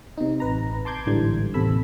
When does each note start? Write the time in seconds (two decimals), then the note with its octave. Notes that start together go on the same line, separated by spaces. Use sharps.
0.18 C3 D#4
0.40 A1 B4 A#5
0.85 A5 C6 D6 G6 G#6
1.06 A1 G#2 D3 E3 G3 G#6
1.54 A1 D#2 C3 A4 B5 E6